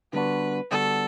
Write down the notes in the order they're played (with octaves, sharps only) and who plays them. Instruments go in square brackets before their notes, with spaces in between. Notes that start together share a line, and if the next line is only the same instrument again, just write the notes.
[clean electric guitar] D3 G3 B3 D4 F#4 [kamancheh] B4
[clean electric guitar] D3 G3 B3 D4 F#4 [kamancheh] A4